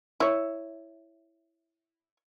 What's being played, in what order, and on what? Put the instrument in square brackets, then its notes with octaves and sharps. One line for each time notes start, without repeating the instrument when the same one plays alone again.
[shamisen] E4 C#5